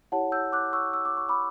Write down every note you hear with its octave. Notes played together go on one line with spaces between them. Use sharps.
E4 G4 C#5 F#5 A5
E6 G6
D6 F#6
C#6 E6
E6
D6
C#6
B5 D6